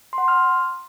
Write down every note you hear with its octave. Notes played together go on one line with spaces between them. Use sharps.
C6
F#5
C6
F6